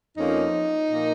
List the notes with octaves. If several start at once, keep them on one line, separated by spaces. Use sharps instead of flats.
F2 F3 A#3 C#4 D#4
A#2 F3 A#3